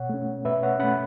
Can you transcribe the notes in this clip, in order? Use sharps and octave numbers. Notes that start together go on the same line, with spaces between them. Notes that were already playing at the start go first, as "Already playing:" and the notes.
Already playing: B2 C#5 F#5
A3 C#4
B2 B4 E5
C#5 F#5
A3 C#4 F#5 B5